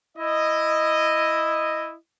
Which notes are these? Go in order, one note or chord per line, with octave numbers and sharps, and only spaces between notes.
E4 D#5